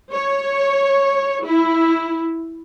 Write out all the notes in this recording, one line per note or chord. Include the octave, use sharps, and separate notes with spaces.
C#5
E4